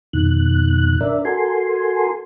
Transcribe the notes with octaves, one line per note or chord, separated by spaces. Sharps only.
F2 B2 D#3 F#6
D4 A#4 D5 E5
F#4 A4 A#4 G#5 C6